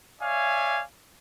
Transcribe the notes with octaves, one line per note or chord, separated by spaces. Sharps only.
C#5 D5 E5 F5 G#5